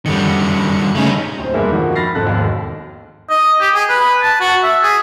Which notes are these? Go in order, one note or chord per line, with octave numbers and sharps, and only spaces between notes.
F#2 D3 D#3 G3 C#7
C#3 G3 A3 C#4 D#4
D1 C5
E1 G2 G#3 A#3 E5
D3 D#3 F3 F#4
B5 F6 A6 A#6 C7
F2 G#2 A4 F#6
E1 D#2 G#2
D#5
G4
G#4
B4
A5
F#4
E5
G#4